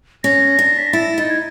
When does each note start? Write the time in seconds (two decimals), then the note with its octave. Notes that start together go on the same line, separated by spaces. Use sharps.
0.24 C#4 A#6
0.59 D4
0.78 B6
0.86 A#6
0.93 E4 A6
1.18 D#4
1.29 G#6